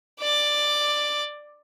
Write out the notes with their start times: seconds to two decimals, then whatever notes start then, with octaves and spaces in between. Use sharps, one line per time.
0.21 D5 D6